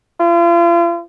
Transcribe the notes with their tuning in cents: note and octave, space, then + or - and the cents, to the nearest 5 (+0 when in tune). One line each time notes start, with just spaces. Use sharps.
F4 -40